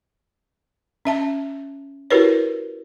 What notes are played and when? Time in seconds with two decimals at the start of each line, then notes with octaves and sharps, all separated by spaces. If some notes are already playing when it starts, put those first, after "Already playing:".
1.05 C#4 E5 A5
2.10 E4 F#4 G4 A#4 B4 C#5